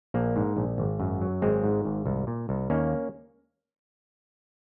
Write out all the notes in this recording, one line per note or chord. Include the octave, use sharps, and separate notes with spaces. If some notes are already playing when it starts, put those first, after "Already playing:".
A#1 A#3
G#2
A#1
G#1
F#2
F#3
G#1 G#3 C4
G#2
G#1
C2
A#2
C2
D#2 A#3 C#4